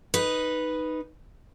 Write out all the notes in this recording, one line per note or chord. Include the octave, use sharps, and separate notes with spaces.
D#4 B4